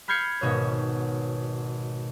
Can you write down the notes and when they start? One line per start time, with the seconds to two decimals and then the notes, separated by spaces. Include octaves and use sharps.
0.08 B5 F6 G6 G#6 C7 C#7
0.41 G#1 B2 C#5